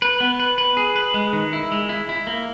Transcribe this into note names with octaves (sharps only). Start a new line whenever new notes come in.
B4
B3
B4
B4
G#4
B4
G#3
D#3
E4
G#3
E4
E4
A#3